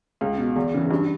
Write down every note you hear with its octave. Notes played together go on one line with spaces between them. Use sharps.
C#2
B2
E2
C#3 E3
G2